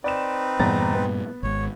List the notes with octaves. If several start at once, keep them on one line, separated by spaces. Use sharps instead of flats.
C4 D#4 B4 D5 E7
E2 G2 A#2 A#5 A6
B3
G#1 G#2 C#5